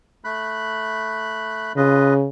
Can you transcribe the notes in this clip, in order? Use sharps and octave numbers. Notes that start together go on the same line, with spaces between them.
A3 B5 F#6
C#3 F4 B4 D#5